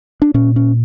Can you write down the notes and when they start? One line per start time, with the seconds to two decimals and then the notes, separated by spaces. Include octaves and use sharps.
0.22 D4
0.34 A#2 C#4
0.56 C#4